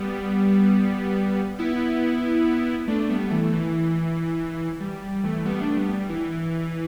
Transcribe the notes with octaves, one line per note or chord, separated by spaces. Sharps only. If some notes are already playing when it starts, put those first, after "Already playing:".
Already playing: G3 B3
B3 E4
A3 D4
G3 B3
E3 A3
E3
G3
G3
E3 A3
G3 B3
A3 D4
G3 B3
G3
E3